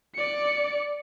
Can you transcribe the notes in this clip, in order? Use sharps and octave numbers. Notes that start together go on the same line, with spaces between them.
D5 C#7